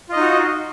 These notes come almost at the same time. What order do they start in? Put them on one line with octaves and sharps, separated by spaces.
F4 D#5 D#4 F#4